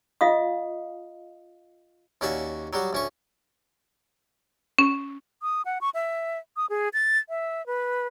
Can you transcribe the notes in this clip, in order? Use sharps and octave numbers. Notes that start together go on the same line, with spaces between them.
F4 D#5 F5 D#6
D#2 C#4 F#4 D5 E5
F#3 G3 F#4
D2 C#4 C#6
C#4
D#6
F#5
C#6
E5
D#6
G#4
A6
E5
B4